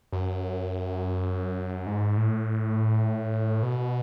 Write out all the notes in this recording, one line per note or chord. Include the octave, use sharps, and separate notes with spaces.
F#2
G#2
A2
B2